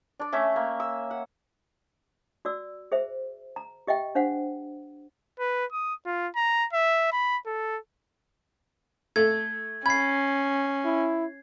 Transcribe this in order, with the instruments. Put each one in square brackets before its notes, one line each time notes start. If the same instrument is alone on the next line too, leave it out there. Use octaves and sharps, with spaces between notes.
[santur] D4 D5
A3 C#4 E5
A#3
E6
F#5
[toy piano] F#4 D5 E6
G#4 C5 E5
A#5
G4 D#5 E5 G5
D4 C5 F5 F#5
[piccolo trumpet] B4
D#6
F4
A#5
E5
B5
A4
[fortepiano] A3 A4 [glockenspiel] G#6
[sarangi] C#4 [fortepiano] B5 [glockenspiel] G#6 C7
[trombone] E4